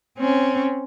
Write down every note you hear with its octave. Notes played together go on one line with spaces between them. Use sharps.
C4 C#4